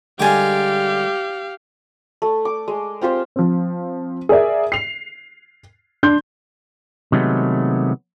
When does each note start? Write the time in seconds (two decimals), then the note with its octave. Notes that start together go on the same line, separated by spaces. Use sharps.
0.20 D3 G3 G#3 G4 D5 F5 G#5 D6
2.22 A3
2.45 D6
2.68 G#3
3.01 C4 F4 G4 C5
3.36 F3 C4
4.29 G#4 A#4 D5 E5
4.72 C7 F7
6.03 D4 C6 G6
7.12 C3 D#3 F#3 G#3 A3 B3